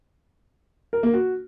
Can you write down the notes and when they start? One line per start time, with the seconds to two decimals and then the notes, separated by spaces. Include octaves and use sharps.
0.93 A#4
1.03 A#3
1.13 F#4